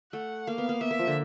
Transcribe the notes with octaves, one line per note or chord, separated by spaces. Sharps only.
A3 F#5
A#3 F5
B3
A#3
B3 E5
A#3
F3
D3